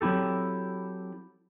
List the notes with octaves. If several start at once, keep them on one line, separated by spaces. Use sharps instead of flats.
F#3 C4 E4 G4 A4